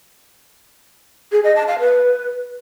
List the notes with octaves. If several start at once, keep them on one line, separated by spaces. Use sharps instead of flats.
G#4
D#5
A5
F5
B4